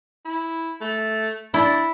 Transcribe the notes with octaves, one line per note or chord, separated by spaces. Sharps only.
E4
A3
D4 E4